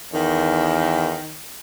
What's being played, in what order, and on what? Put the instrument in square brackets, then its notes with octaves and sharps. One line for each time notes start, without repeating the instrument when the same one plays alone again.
[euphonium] E2 [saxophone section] D#3